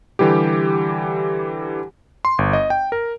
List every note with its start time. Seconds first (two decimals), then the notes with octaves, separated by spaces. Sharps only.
0.19 D3 E3 G3 G4
2.25 C6
2.38 G1
2.53 D#5
2.70 G5
2.92 A#4